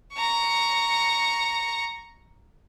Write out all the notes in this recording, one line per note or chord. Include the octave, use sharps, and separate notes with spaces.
A#5 C#6